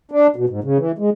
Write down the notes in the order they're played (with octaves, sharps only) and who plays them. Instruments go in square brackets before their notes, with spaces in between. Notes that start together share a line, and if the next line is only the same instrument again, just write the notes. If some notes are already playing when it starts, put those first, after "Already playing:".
[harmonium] D4
B2
G#2
C#3
E3
G#3